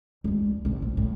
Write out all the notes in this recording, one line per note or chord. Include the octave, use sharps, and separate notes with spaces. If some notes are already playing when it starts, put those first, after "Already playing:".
D2 G#3
A#1 D3
A#1
A2